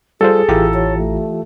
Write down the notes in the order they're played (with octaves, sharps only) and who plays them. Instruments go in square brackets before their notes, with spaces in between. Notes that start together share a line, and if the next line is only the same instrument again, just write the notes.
[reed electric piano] G3 F4 C5 [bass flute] G#4 [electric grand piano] A4
[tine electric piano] A1 E4 A#5 [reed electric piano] E3 F4 G4
[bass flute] C#5
A3